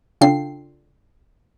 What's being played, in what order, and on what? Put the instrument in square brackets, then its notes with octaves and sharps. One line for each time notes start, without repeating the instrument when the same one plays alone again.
[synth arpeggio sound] C#3 D4 F4 A4 G5 C7